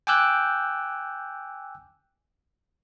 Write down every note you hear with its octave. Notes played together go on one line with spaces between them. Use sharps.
G5 G#5 D6 E6 F#6 G6